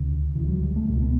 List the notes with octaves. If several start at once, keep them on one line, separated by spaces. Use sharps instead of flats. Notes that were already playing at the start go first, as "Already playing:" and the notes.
Already playing: D2 C#3
D2 C#3 E3
F#3
G3
A3
C#2 B2 A3
B3